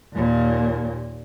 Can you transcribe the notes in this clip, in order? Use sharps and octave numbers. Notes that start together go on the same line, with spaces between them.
D#2 A#2